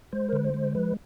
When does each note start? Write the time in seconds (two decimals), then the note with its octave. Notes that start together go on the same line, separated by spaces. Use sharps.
0.12 G#3 C5
0.29 A#4
0.33 D3 B4
0.44 C5
0.54 G#3
0.75 F3 B4